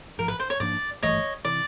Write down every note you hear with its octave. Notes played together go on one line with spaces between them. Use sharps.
A1 G#2 F3 A#4
B4
C5
C#5
G#2 F3 A#3 D4 D5
G#1 G2 E3 A3 C#5 D#5
C3 E3 D5